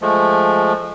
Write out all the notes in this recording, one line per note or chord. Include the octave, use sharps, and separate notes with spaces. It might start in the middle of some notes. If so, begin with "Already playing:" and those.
F3 G#3 A3